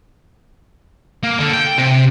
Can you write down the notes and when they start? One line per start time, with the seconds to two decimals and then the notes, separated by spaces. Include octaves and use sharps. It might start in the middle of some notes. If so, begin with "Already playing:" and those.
1.23 A#3
1.39 D3
1.53 G5
1.78 C3